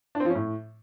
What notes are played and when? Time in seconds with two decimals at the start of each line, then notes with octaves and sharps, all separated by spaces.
0.15 D4
0.20 C4
0.25 F3
0.30 C#4
0.35 A2